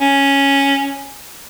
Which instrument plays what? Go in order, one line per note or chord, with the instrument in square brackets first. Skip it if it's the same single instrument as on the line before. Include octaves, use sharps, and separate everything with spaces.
[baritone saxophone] C#4